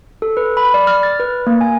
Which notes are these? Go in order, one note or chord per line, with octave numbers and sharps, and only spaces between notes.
A4
B4
B5
D5
F6
A6
B4
A#3
G#5